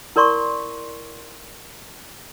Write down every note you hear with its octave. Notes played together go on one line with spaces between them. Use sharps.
E4 A#4 D5 C6 C#6